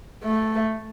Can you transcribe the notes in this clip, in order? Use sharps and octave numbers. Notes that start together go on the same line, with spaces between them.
A3